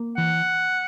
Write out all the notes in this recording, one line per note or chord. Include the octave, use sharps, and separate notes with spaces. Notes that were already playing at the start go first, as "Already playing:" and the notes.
Already playing: A#3
E3 F#5